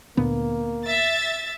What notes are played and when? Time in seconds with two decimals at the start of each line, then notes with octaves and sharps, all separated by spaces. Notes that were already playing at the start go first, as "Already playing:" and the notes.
0.17 D2 A#2 D3 A#3 B3
0.83 E5 A6